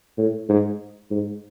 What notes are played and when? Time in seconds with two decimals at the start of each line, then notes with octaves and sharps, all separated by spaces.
0.18 A2
0.49 G#2
1.11 G#2